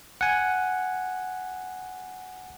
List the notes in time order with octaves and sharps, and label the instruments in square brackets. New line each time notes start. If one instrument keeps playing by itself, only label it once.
[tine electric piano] F#5 G#5